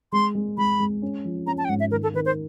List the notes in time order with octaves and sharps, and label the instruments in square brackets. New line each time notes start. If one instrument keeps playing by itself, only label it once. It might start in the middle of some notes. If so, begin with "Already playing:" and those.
[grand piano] G#3 [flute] C6
[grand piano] G#3
[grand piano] G#3 [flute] B5
[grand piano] G#3
C#4
F3
[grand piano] C#4 [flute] A#5
[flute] A5
G5
[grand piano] G#2 [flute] F#5
[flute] E5
[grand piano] D#3 [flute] A#4
[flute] A4
[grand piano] D#3 [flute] B4
[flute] C5